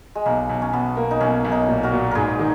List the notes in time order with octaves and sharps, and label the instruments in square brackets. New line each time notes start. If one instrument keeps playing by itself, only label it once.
[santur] G#3
[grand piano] B1 [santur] A#3
[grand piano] B1
[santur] C#4
[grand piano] B1 [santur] B3
[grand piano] A#3
[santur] D#4
[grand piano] B1 [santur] C#4
[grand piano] B1
[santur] D#4
[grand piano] A#2
[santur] F#4 A#4
[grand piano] A#2
[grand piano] G#2 [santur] G#4 A#4 B4
[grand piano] D#3